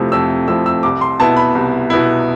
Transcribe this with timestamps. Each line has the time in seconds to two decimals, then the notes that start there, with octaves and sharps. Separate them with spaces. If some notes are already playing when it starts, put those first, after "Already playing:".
Already playing: F2 C3 F3 A3 E4
0.12 F2 E6
0.48 C3 F3 A3 E4 E6
0.66 E6
0.83 C2 D6
1.01 C6
1.20 B2 B3 E4 A5
1.37 B5
1.55 C2
1.90 B2 B3 E4